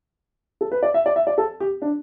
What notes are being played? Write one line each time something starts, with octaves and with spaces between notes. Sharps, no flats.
A4
B4
D5
E5
D5
E5
D5
A4
G4
D4